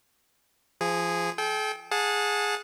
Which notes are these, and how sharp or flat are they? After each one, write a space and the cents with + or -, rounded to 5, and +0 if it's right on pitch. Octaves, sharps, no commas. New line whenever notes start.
F3 -25 G#4 -10
A4 -45 G5 +0
G#4 +0 F#5 -30 A5 +0